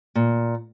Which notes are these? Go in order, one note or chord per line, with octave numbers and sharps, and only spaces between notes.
A#2